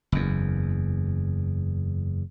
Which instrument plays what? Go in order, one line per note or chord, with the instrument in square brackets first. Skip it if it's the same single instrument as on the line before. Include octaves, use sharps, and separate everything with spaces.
[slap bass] F#1 E2